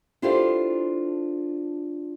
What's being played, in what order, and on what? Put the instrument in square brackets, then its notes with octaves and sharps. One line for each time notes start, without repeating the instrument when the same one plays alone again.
[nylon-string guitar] D4 E4 F4 G4 A4 C5